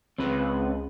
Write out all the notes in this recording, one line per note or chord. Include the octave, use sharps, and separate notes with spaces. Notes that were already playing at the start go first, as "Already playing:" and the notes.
C#2 C4 B4